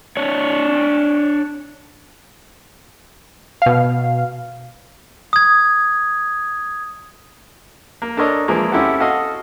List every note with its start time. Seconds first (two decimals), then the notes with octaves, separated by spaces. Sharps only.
0.17 D4 C#5
3.62 B2 F5
5.33 D#6 G#6
8.02 A#3
8.17 D4 A4 A#4 C#5 D#5
8.48 E3 F3 G#3 A#3
8.72 C4 C#4 E4 G4 A4 F#5
9.00 F#4 A4 D#5 F5